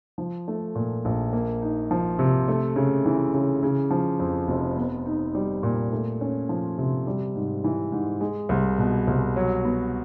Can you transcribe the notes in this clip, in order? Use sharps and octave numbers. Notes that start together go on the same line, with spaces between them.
F3
A3
A#2
A#1
A#3
D#4
F3
C3
A3
C#3
E3
C#3
C#3
F3
F2
F1
B3
D#4
G3
A#2
A3
C#4
F3
C3
G3
G#2
E3
G#2
G#3
C2
B2
C2
F#3
B3